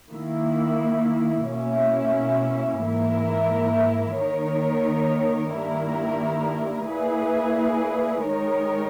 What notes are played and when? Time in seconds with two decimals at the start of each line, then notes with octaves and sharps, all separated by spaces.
0.11 D#3 A#3 E4
1.46 B2 A#3 C#4 E4
2.81 G#2 E3 A#3 E4 A#4
4.16 D#3 A#3 D#4 A#4 C#5
5.52 G2 D#3 A#3 E4 A#4
6.87 A#2 A#3 E4 G#4 B4
8.22 D#3 G#3 D#4 A#4 C#5